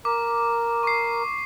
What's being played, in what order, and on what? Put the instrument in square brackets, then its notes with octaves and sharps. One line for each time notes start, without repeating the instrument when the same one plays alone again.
[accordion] A#4 [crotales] D6
[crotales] C#6 C7